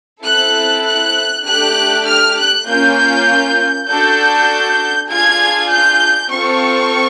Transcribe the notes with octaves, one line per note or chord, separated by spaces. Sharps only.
C4 E4 A4 F#6
F#6
A3 D4 G4 F#6
F6
F#6
A#3 C#4 F4 G6
D4 F#4 A4 G6
D4 F4 G#4 G#6
G6
C4 F4 A4 C#6